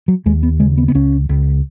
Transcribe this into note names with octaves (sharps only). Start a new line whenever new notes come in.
F#3
D#2 G#3
B3
C#3 G#3
B3
B3
C#2 C#4
C#2